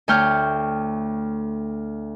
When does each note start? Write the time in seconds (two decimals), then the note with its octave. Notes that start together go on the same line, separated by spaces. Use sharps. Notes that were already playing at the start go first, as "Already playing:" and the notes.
0.08 D2 A3 C#5 G5 F6 G6